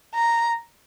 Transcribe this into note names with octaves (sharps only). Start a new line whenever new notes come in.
A#5